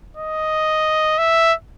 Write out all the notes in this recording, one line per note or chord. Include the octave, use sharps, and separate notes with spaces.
D#5
E5